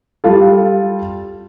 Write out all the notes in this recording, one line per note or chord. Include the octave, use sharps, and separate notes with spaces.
G3 F4 A4